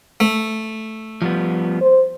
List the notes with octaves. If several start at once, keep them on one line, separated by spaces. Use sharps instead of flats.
A3
F3 G3 B3
C5